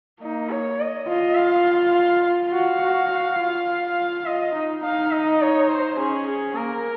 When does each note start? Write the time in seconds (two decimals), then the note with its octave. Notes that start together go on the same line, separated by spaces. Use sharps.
0.22 A#3 D#4
0.50 C#5
0.80 D#5
1.08 F4 D#5
1.37 F5
1.95 F5
2.52 F#4 F5
2.81 F#4
3.10 F#4
3.39 F4
4.25 F4 D#5
4.55 D#4
4.83 D#4 F5
5.11 D#5
5.41 C#5
5.69 C5
5.98 C#4 G#4
6.26 G#4
6.56 A#3 A#4